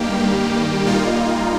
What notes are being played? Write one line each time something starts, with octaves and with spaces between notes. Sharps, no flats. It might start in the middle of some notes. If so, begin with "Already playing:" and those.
Already playing: G2 D#3 G3 A#3 G4
A#2 G3 A#3 D#4 F4